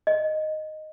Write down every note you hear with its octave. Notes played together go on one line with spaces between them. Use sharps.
D#5